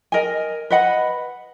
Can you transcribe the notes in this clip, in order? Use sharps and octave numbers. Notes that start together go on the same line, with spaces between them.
A#4 D#5 G#5
B4 D#5 F#5 B5